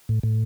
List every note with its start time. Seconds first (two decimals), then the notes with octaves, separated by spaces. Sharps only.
0.09 A2
0.23 A2